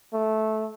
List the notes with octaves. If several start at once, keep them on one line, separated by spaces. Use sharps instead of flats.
A3